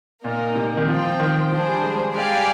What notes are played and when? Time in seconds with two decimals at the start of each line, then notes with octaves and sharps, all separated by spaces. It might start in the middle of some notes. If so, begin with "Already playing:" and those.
0.24 A#2 A#3 D#4 A#4
0.56 C3
0.77 D#3
0.88 F3 C4 F4 C5 G5
1.04 F3
1.20 D#3
1.51 F3 D4 G#4 C5
1.68 G3
1.83 G#3
2.15 G#3 G4 D5 F5 G#5
2.31 G3